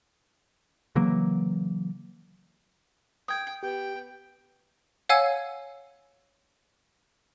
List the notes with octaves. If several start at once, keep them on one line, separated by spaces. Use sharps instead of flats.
C#3 E3 F#3 A#3
G5 D#6 G#6
B3 G4 G5
C#5 F5 F#5 G#5 E6 G#6